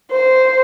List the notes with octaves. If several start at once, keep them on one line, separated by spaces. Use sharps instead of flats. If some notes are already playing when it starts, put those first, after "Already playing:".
C5